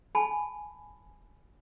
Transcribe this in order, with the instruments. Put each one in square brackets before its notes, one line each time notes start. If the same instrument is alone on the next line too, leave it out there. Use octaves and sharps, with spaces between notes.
[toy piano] G#5 A5 B5